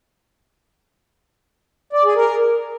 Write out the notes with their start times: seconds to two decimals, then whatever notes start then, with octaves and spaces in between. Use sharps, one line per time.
1.93 D5
2.05 G#4
2.16 A#4